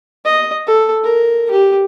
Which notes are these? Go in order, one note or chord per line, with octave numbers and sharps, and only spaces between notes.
D#5
A4
A#4
G4